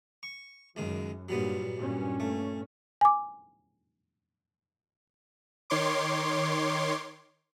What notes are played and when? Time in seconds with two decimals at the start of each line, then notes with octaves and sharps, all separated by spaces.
0.23 C#6
0.76 C#2 F#2 D#3 G#3
1.29 G2 A#2 F#3 G3 B3
1.77 G2 A#2 C#4
2.20 A3
3.01 G#5 D6
5.70 D#3 C#5 C6 D6